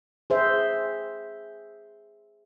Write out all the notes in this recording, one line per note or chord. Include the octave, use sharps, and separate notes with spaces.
G#4 C5 E5